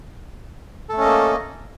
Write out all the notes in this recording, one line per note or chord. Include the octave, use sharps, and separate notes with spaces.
A3 A#3 C#4 A4 D#5